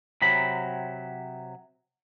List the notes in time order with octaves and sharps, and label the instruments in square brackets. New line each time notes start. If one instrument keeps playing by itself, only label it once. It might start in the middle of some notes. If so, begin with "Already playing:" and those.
[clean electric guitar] C3 F#3 B5